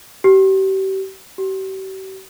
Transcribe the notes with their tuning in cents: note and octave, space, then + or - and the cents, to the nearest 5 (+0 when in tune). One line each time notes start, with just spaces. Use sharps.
G4 -35
G4 -45